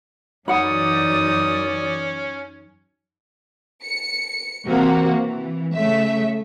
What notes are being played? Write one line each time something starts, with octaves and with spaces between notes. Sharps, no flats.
F#2 E3 C#4 D#4 D5 F#5 B5 D#6
C#7
C3 E3 A#3 F#4
E3
C#3 A3 E5